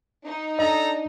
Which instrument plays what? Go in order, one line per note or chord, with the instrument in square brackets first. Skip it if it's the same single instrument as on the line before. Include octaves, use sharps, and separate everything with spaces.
[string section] D#4
[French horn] D4 [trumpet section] A4 A#5 [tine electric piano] D#5